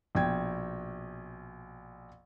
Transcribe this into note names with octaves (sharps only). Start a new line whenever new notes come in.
A#1 B2 G5 G#6